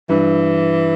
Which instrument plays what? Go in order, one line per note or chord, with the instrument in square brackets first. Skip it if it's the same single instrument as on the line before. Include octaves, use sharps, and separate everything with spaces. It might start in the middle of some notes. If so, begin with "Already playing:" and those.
[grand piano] G2 [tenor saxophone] E3